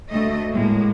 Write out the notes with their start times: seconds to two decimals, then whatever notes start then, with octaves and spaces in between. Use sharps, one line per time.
0.11 D2 A3 D#5
0.52 A2 G#3 A#3